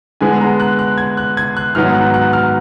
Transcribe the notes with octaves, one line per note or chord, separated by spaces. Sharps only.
D3 G#3 B3 G#5
A#5
F#6
F#6
G#6
F#6
G#6
F#6
G#2 D#3 F#3 B3 D#4 F6
F#6
F#6
F6